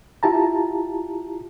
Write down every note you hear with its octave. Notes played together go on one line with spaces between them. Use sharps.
E4 F4 G4 A5 A#5